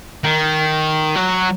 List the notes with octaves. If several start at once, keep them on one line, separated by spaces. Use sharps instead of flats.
D#3
F#3